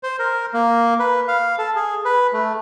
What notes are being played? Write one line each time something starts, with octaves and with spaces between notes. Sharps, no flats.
C5
A#4
A#3
B4
F5
A4
G#4
B4
A3